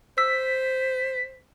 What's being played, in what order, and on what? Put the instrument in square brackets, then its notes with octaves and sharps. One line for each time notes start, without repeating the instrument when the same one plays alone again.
[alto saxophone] C5 [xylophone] E6 [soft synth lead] B6